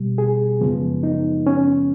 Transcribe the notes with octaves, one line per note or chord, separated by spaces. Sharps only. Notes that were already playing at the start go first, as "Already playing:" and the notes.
Already playing: B2 G3
G#4
F#2 C#3 F3 G#3 B3
D#4
C#4